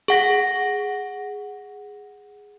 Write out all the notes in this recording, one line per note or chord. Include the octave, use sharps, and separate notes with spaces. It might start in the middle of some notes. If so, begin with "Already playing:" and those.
G#4 F#5 A#6